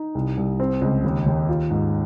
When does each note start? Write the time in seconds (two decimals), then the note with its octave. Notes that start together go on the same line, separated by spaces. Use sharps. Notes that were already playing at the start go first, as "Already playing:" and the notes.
Already playing: D#4
0.15 C2
0.37 C2
0.60 C4
0.82 C#2
1.04 D#2
1.26 D#2
1.49 F4
1.70 G#2